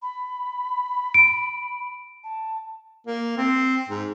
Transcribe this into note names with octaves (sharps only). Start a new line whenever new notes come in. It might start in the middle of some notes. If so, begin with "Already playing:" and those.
B5
D7
A5
A#3
C4
G#2